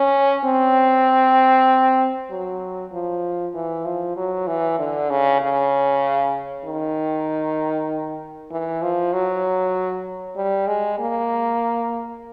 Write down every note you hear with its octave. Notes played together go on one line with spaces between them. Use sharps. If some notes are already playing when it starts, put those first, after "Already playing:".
Already playing: C#4
C4
F#3
F3
E3
F3
F#3
E3
D3
C#3
C#3
D#3
E3
F3
F#3
G3
G#3
A#3